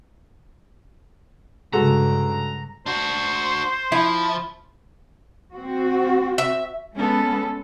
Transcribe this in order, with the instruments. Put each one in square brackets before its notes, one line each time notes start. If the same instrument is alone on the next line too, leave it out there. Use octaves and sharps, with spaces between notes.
[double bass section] G2 C#3 [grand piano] G#3 F#4 A4 [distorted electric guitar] A#5
[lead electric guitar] D4 F#4 [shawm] C5
[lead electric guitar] F3 [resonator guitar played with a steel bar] E4
[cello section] C4 F#4
[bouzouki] E5
[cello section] G#3 B3 [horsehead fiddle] C#4 A4